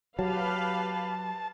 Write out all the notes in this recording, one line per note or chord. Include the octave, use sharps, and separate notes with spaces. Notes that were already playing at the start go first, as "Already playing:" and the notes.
F#3 G4 B4 F5 A5